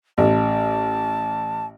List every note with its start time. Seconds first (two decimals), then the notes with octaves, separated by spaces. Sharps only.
0.18 A1 A5